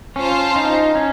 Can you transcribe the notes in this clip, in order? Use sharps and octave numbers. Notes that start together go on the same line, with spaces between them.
C#4 F4 C5 F5 A5
D#4
C#4